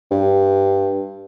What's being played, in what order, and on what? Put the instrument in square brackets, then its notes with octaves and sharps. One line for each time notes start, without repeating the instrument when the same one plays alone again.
[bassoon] G2